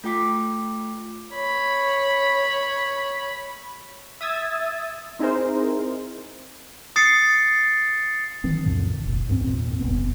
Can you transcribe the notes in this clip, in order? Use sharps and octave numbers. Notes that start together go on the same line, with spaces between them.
A3 F4 G5 D6 B6
C#5 B5
E5 D#6 E6 G#6 A6
C4 D#4 E4 G#4 A#4 C5
D#6 A6 C7 C#7
D#3 E3 F#3 C4
C#2 F#2 A#2 D3
F1 A#1
C#2 G2 F#3 C4
G#1 E2 A#2 C4
F1 C#2 G2 B3